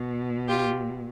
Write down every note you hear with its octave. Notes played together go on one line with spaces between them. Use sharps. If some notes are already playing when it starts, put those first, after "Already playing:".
Already playing: B2
F4 G4